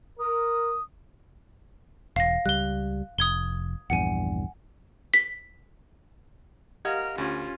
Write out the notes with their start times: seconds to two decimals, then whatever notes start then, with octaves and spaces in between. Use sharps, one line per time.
0.19 A#4 D#6
2.16 E1 F5 A#6
2.46 C#2 G3 F#6 G7
3.18 F1 D#6 G#6 G7
3.90 A#1 E2 G2 F#5 G#5
5.14 B6
6.85 G4 A#4 D#5 F5 F#5 F6 G#6
7.18 D2 C#4 F4